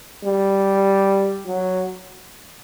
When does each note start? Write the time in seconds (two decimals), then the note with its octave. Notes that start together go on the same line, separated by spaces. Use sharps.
0.24 G3
1.47 F#3